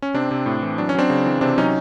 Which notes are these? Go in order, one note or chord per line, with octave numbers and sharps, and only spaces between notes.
C#4
C3 C4 D4
C3
A2
E3
F#3 D4
C#4
F#3 C4 D4
C#3
E3
C3 C4 D4
F#3 C#4 D#4